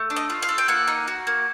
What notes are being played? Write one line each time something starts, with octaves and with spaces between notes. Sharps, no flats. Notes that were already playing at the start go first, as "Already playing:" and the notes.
Already playing: A3
D4
D#5
F4
F5
A4
G5
A#3 F#5
D#4
F#4
A#3